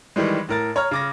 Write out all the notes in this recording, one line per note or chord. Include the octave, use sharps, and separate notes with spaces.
D#3 E3 G3 G#3
A2 A#4 A6
C#5 A#5 F6
C#3 D6 A#6